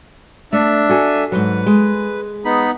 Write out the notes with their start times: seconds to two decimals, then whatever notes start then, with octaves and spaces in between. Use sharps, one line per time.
0.53 A3 D4 E5
0.89 F#4 A4 G#5
1.32 G#2 F#3 B4
1.66 G#3
2.45 B3 D#4 B5